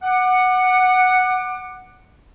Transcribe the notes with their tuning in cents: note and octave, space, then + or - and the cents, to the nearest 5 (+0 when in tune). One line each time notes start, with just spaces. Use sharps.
F#5 +0 D6 +30